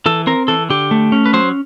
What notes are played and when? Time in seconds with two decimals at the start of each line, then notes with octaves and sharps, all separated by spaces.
0.06 E3 A4
0.27 C4 A#4
0.48 E3 A4
0.70 D3 G4
0.91 A3
1.12 C#4
1.26 B4
1.33 F#3 C5